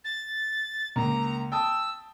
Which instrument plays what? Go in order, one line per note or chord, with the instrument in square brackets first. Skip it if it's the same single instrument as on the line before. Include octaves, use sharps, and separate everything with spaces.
[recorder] A6
[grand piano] C#2 A#3 [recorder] A#5
[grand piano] G5 A5 D#6 [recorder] E6